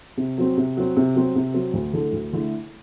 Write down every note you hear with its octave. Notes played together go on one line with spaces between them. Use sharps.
C3
F#3 C4
C3
F#3 C4
C3
F#3 C4
C3
F#3 C4
D2
D3 A3 E4 A4
D2
D3 A3 E4 A4